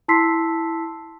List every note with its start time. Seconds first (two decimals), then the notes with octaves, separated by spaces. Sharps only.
0.08 E4 A5 C6 E6 B6 C7